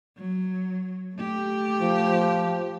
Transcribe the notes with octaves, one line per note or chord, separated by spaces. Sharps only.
F#3
A3 G4
F3